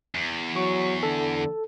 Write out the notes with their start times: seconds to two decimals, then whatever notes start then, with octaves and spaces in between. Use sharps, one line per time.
0.15 E2
0.56 F#3 C#6
1.03 D3 A4